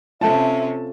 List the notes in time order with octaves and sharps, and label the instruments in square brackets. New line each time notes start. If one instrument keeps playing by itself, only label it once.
[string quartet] C3 C#4 [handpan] F4 A4 [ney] E5 [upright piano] A5